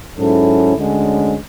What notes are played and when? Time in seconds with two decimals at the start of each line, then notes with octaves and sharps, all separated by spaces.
0.16 G#2 F#3 C#4 E4 A4
0.76 D2 D3 G#3 C#4